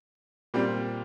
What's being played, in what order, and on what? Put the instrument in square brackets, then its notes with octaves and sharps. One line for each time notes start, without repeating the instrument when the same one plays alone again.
[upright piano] A#2 G3 C4